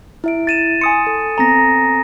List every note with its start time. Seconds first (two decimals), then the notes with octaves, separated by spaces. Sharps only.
0.24 E4 E5 D7
0.47 A6 D#7 E7
0.81 G#5 C6 D#6 C#7
1.07 A4
1.38 B3 C4 A4 A#5 A#6